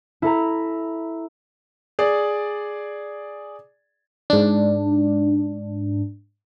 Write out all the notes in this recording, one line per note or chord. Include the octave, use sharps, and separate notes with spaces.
E4 A4 A#5
G#4 D5
G#2 D4